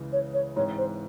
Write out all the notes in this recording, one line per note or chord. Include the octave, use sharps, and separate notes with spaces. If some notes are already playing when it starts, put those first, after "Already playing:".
Already playing: C#2 C#3 E3 G#3
C#5
C#5
G#2 E3 G#3 C4 C#5
C5